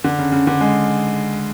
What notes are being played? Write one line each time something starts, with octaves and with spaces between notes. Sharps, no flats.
D3
C#3
C#3
D3
G#3